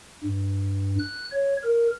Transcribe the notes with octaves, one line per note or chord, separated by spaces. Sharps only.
G2
F#6
C#5
A#4